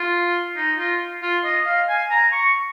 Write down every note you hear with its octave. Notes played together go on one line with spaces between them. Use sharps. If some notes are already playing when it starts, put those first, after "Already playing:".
Already playing: F4
D#4
F4
F4
D#5
F5
G#5
A#5
C#6